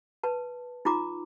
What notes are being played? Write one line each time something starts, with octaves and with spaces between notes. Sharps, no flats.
B4 A5
D#4 F4 A#5 D6